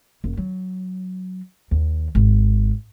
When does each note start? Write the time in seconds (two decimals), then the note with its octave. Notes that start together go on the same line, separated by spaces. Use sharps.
0.24 F#1
0.37 F#3
1.71 D#2
2.15 G#1